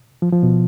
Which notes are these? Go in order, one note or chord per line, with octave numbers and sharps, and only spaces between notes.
F3
F3
B2